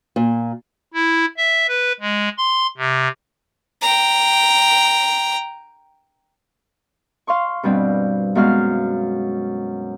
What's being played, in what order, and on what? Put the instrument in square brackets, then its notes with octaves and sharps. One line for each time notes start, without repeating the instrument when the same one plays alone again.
[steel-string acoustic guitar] A#2
[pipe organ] E4
E5
B4
G#3
C6
C3
[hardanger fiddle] G5 A#5
[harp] F5 C6 C#6
G2 B2 G3 C4
F#2 G#3 B3 F#4 F5 F6